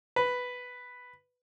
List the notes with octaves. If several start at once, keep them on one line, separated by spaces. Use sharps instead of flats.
B4